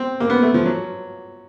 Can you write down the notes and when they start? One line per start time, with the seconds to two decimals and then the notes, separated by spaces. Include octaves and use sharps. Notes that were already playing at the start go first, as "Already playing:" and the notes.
Already playing: C4
0.20 A#3
0.30 B3
0.42 A3
0.54 F3
0.66 F#3